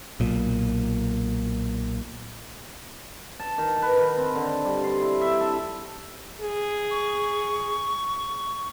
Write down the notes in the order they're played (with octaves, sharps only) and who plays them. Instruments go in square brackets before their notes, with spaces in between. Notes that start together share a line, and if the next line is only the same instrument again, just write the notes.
[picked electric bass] B1 A#2
[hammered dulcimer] A5
D#3
B4
D#3
C4
D3
G3
C6
E4
E5
A4
[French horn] G#4
[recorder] C#6